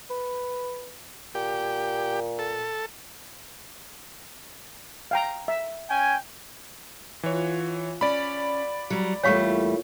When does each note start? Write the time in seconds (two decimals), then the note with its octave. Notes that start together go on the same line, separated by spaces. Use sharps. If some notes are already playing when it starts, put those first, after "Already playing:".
0.10 B4
1.35 A#2 G4
2.39 A4
5.11 F5 G5 A#5
5.48 E5
5.90 C#4 G5 G#5
7.23 E3 F4 C#5 F#5
8.01 C#4 D5 B5
8.90 F#3 G3
9.23 E2 A#2 G3 A3 C#5 F5 C#6